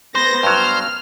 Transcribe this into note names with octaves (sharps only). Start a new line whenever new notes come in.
B3 C5 A#6
G2 F#3 F6